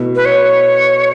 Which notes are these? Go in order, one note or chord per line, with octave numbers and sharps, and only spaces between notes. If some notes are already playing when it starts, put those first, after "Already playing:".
Already playing: B2 A3 E4
B4
C#5